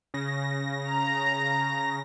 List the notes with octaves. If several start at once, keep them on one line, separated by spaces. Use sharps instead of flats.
C#3 A#6
A#5